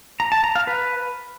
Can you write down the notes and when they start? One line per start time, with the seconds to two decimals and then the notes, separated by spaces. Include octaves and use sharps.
0.20 A#5
0.32 A5
0.44 A#5
0.55 F5
0.67 B4